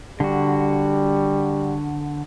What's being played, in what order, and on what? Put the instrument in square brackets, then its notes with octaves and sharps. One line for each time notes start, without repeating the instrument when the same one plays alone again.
[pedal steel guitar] D3 F#4 [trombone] G3